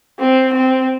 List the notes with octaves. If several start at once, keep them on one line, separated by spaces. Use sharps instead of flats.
C4
C4